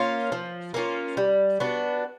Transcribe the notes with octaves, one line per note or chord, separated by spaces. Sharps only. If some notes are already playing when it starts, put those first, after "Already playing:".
Already playing: A#3 C#4 F4
F3
A#3 C#4 F4
G3
B3 D4 F#4